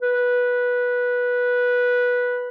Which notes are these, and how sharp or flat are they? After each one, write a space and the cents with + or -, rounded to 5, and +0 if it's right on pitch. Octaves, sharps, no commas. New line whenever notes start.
B4 -10